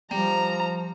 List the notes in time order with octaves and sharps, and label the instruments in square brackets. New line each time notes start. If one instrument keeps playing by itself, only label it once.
[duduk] F3 [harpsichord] G3 [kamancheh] A#5